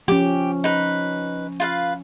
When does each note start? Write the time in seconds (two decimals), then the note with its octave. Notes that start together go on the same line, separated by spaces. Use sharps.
0.08 F3 C#4 G4 D6
0.64 D#4 B4
1.60 F4 B4 F5